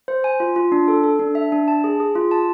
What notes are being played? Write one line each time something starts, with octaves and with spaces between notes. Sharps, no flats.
C5
G#5
F4
F4
D4
A4
A4
D4
E5
D4
A5
G#4
G#4
F4
A5